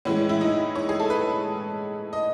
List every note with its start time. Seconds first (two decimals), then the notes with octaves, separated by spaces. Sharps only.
0.05 A2 E3 G#3 C#4
0.29 E4
0.41 D#4
0.75 C#5
0.89 G#4
1.00 A4
1.10 B4
2.13 D#5